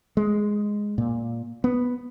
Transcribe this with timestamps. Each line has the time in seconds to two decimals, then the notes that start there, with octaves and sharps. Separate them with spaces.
0.17 G#3
0.98 A#2
1.64 B3